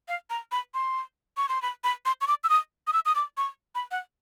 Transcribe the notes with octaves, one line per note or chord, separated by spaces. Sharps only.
F5
A#5
B5
C6
C#6
C6
B5
B5
C6
C#6
D6
E6
D#6
D#6
E6
D#6
D6
C#6
B5
F#5